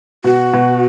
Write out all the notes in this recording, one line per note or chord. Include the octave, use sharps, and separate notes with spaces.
B2 F#4
B2